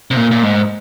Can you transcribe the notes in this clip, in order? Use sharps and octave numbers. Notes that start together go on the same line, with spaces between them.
C3
A#2
A#2
G#2